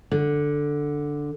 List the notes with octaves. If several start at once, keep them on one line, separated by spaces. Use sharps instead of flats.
D3